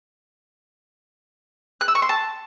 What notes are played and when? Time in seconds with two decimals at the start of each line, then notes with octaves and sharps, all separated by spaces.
1.81 F#6
1.88 E6
1.95 C#6
2.02 C6
2.09 A5